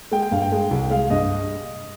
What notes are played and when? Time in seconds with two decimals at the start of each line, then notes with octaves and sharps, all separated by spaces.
0.11 G#3 G5
0.23 G5
0.31 G2 F5
0.42 G5
0.52 G#3
0.71 C2
0.90 G#3 F5
1.10 G2 D#5